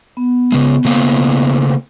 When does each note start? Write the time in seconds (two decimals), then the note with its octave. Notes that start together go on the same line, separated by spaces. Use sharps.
0.17 B3
0.52 C#3 G#3
0.85 C#3 A3 A#3